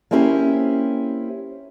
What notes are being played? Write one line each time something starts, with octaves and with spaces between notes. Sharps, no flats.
A#3 C4 C#4 E4 G4 C5